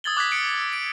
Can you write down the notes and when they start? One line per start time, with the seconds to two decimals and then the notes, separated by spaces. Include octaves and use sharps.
0.04 D#6 E6 G#6 A6 F#7 G7
0.17 D6 F#6 G#6 B6
0.32 C#7 D7
0.55 E6
0.73 D7